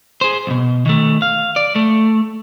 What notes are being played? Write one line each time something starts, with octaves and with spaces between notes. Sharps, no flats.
G#4 C5
B1 B2
D#3 A3
F5
D5
A3